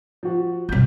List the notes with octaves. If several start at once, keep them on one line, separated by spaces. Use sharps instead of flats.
F3 F#4
G2 C3 G6 B6